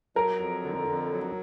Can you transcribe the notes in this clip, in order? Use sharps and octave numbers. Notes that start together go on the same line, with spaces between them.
F#3 A#4
F2
D3
F2
F#3